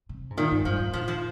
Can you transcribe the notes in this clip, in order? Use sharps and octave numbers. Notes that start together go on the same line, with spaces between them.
C3
G#2
A#2 D#3
G#2
G2 F3
G#2
A#2 F3
F3